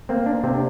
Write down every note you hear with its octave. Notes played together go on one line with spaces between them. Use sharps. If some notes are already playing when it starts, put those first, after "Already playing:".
A#3 C4
D4
C3 C4
D4